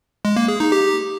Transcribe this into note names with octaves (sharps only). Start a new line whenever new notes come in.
G#3
A#3
G#4
D#4
G4